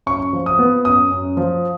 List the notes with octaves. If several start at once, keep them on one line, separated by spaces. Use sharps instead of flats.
F#2 C#6
F3
D#6
B3
F#2 D#6
F#2
F3